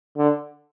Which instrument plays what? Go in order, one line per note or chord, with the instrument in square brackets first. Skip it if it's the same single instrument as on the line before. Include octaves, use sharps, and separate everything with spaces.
[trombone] D3